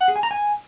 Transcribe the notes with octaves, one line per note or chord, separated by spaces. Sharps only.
F#5
G#4
G#5
A#5
G#5